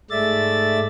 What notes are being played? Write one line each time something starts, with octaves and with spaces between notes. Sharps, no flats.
G#2 G#3 A3 D5 E5 A6